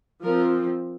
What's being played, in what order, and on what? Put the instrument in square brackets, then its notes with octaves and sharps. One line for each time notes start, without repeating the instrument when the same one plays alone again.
[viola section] F3 C4 A#4